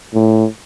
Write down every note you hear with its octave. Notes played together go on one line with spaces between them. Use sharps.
A2